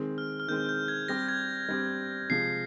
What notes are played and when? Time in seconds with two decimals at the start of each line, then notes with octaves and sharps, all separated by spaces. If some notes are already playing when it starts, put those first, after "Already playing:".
Already playing: D#3 G#3 C4
0.18 F6
0.40 F6
0.48 D#3 G#3 C4 G6
0.69 G6
0.88 G#6
1.08 G3 C4 G4 A#6
1.29 G#6
1.69 G3 C4 G4
2.30 C3 F3 G#3 C7